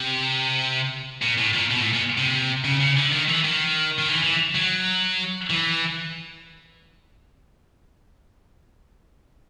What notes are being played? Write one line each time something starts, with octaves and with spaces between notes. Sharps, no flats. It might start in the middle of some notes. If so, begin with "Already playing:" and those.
Already playing: C3
A#2
A2
A#2
B2
A2
A#2
C3
C#3
C#3
D3
D#3
E3
D#3
D#3
E3
E3
F#3
E3